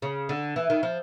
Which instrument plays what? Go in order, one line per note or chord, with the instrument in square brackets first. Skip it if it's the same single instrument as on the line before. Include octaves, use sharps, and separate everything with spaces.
[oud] C#3
D3
E3
D#3
F3